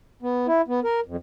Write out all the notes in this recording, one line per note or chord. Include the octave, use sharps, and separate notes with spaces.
B3
E4
B3
A#4
F2